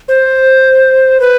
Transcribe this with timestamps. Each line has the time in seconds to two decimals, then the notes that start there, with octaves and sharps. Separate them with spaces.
0.08 C5
1.20 B4